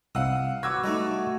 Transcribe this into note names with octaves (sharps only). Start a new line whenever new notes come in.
C2 C3 F5 F#5 D#6 E6
F#4 B4 D6 E6 G#6
G3 A3 D#4 A4 D#5